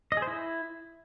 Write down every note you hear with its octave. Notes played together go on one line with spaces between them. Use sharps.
D#5
G#4
C5
E4